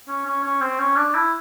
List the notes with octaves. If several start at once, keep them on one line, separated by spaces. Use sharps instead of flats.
C#4
C#4
C#4
C4
C#4
D4
E4